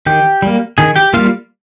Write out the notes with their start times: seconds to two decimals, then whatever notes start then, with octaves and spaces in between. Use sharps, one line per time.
0.06 D#3 G4 G5
0.42 G3 A#3
0.78 D#3 G#4 G#5
0.96 G4 G5
1.14 G3 A#3 F4 F5